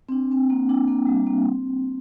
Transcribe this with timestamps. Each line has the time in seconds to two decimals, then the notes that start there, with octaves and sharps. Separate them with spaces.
0.09 C4
0.12 D4
0.31 C4
0.50 A#3
0.69 D4
0.88 A#3
1.07 G3
1.27 A#3
1.45 C4